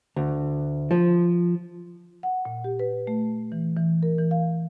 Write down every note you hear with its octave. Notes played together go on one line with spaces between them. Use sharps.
D2
F3
F#5
A#2
G4
B4
A3
E3
E3
A#4
E3
F5